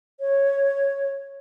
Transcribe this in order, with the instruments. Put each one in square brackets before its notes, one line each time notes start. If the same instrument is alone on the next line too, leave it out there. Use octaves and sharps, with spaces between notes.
[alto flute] C#5